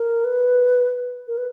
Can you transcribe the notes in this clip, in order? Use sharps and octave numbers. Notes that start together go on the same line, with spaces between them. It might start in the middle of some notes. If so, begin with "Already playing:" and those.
Already playing: A#4
B4
A#4
B4